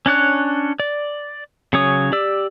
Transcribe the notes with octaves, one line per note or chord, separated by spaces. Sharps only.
C#4 D4 C#5 F#6
D5
C#3 F#3 C#4 C#5 D#6
G4 D5 E6